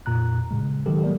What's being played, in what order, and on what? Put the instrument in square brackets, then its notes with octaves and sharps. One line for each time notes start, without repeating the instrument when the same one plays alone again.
[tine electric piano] F2 A#2 A#5 F#6
A2 C#3 G#3
D#3 F#3 G#3 G4 A4
F#3 G#3 A#3 A#4 D5